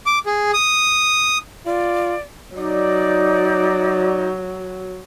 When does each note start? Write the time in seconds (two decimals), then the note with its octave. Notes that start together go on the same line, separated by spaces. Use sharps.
0.06 D6
0.26 G#4
0.54 D#6
1.66 F4 D5
2.57 F#3 D#4 D5